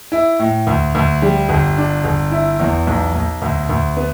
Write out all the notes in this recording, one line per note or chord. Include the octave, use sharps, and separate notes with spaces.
E4
A2
D2
D2
G3
G1
D4
G1
E4
E2
B1
B1
D2
D2
B3